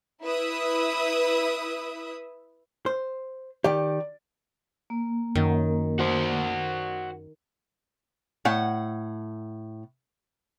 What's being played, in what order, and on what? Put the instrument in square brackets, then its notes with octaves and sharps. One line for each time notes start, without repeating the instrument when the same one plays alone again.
[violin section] E4 B4 E5 D#6
[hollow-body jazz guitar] C5
[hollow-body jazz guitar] D#3 G4 [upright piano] D5
[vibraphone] A#3
[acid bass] F#2 [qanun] D#3
[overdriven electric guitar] F#4 C5
[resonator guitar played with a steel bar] A2 F#5